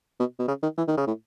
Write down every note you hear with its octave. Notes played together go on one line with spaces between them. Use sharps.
B2
B2
C#3
D#3
E3
D#3
C#3
A2